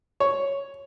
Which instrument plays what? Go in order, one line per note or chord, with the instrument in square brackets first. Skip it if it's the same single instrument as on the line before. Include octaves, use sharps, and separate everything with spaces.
[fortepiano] C#5